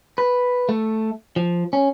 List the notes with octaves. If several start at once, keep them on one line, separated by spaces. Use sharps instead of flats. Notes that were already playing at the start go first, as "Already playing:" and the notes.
B4
A3
F3
C#4